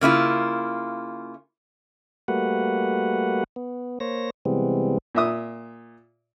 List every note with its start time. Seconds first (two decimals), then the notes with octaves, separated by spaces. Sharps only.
0.01 C#3 A#3 E4 F4
2.28 G3 A3 A#3 F#4 B4 F#5
3.56 B3
4.00 A#3 C5 C#5 A#6
4.45 C3 E3 G3 G#3 B3 C4
5.15 A#2 E5 D#6